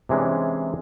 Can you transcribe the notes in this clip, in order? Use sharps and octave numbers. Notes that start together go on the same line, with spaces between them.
C3 E3 G#3 C#4 D4